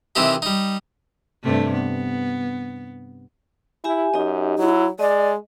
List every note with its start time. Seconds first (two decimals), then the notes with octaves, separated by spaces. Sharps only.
0.16 C3 D#3 E3 C4 D#4 G4
0.42 G3 D#4
1.43 G2 C3 A3
1.73 B3
3.84 E4 G4 E5 G#5
4.14 F#2 D#4 G4 D#5
4.58 F#3 E4
4.99 G#3 D5 D#5